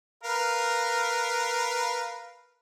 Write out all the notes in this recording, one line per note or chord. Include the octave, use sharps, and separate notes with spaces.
A#4 B4 F5